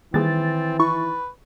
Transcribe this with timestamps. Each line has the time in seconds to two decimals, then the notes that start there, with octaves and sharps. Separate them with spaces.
0.14 D#3 E3 G3 A#3 C4 G#4 A6
0.79 E4 B4 C#6